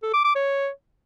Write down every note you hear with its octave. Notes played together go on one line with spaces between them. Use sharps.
A4
D6
D6
C#5